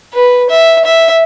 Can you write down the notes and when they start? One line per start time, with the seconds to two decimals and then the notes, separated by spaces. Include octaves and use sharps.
0.14 B4
0.50 E5
0.85 E5